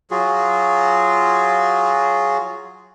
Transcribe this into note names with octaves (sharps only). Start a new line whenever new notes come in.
F#3 F4 F#4 G#4